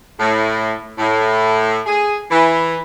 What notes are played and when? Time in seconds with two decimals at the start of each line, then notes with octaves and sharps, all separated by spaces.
0.19 A2
0.98 A2
1.86 G#4
2.31 E3